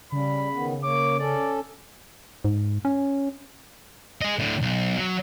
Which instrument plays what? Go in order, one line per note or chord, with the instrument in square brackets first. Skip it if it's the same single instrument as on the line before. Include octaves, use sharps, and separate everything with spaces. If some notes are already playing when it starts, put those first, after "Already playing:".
[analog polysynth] C#3 [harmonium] G3 [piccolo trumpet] B5
[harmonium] D#3 B3
[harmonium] A#3 C#5 [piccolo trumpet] D6
[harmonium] C#4 A4 [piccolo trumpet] D5
[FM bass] G#2
C#4
[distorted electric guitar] G#4 D#5
A2 D3
B1
F#3